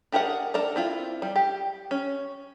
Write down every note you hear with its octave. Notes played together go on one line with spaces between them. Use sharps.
D4 G4 G#4 A#4 F#5
D4 A4 A#4 D5
C4 E4 F4
G3
G4
C#4